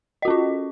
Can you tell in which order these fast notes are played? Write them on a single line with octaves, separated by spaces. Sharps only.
D#5 F#4 C#4 F4